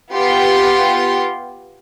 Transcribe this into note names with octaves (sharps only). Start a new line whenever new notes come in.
B3 F4 G4 C6